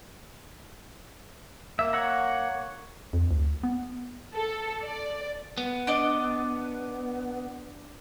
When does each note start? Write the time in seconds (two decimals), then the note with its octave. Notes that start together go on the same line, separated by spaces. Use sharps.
1.79 A#3 E5
1.93 C#5 F#5 A#5
3.13 F2
3.31 D2
3.63 B3
4.33 A4
4.82 D5
5.58 B3
5.87 D4 D5 D#5